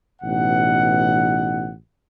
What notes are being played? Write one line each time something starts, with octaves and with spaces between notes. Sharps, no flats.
A1 B2 D#4 F#5